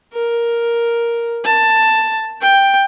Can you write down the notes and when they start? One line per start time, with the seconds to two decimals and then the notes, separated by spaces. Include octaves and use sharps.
0.13 A#4
1.45 A5
2.41 G5